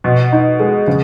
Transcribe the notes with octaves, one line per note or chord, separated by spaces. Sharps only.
B2
D#4
G#3
C#3